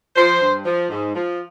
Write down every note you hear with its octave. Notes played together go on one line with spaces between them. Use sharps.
F3 C5
G2
F3
G#2
F3